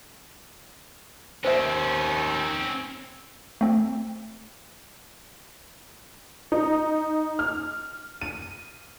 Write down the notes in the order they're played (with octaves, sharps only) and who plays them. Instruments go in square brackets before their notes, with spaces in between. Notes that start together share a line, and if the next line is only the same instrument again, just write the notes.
[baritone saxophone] D#2 [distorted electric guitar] C4 C#4 [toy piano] C5 E5
[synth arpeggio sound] A3 C4
[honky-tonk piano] D#4
F6
D#7